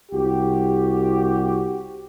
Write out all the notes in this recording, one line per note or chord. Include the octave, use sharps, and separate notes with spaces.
C2 F#4 G4